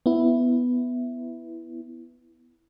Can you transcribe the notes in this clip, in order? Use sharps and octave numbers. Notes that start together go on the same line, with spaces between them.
B3 E4